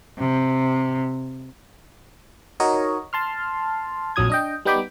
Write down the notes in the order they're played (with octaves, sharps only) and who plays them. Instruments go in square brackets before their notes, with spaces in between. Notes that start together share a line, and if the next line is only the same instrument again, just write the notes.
[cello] C3
[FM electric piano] D#4 F#4 A#4 C#5 D#5
A5 C6 F6
A#1 F2 F#3 D#6 G#6
D4 D#5 G5
G3 B3 D#4 G5 B5 D6